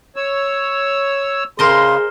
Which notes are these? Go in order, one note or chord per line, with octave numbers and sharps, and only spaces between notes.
C#5 E6
C#3 G#4 A#4 C5 D#5 C6